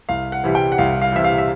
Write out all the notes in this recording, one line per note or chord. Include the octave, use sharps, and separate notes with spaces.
C2 F5
F#5
C3 E3 G3
G5
F#5
C2 F5
F5
C3 E3 G3 E5
F5
E5